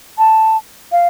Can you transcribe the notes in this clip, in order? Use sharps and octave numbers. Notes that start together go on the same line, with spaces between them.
A5
F5